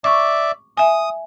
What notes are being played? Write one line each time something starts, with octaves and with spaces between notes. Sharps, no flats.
D5 E5 C#6 D6
E5 G#5 D#6